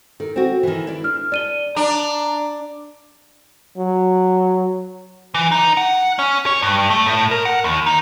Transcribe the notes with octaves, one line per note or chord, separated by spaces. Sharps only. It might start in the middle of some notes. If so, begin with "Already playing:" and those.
D#3 A4
C4 F#4
D#3 E3
E4 D5
D4 F6
D4 D5 D#7 G7
D4 A#5
F#3
E3
D#4
F#5
C#4
C#5
G2
A3
A2
A#4
F#5
D#2
D#4